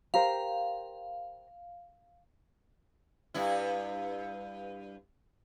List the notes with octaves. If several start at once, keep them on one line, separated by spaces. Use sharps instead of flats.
G4 A#4 C5 F5
G2 E4